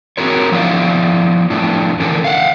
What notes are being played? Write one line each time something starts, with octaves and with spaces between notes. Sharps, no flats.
C4 F#4 G#4 A#4 C#5
F3 B3 E4 F4 D5 F5
F2 A2 D4
D3 E3 C#4 D4 A4 A#4
F5 F#5